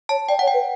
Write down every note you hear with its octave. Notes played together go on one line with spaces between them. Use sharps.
C#5 A5
D5 G5
C#5 F#5
G5
B4